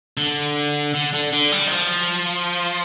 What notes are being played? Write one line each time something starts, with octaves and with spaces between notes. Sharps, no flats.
D3
D3
D3
D3
G3
D#3
F3